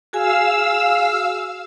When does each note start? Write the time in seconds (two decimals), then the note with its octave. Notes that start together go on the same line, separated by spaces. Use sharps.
0.13 F#4 G#4 F5 G#5 E6